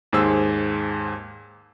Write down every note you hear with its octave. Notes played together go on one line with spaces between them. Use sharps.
D#2 G#2 G#4 C5 E6